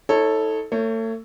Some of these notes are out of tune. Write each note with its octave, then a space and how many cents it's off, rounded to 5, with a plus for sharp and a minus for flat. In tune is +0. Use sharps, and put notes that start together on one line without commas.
D#4 +35 A4 +0 C#5 -15
A3 +40 C#5 +0